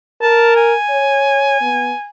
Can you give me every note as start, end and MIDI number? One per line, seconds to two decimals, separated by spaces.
0.22 0.74 70
0.22 0.51 81
0.56 2.10 80
0.90 1.58 73
1.62 1.93 59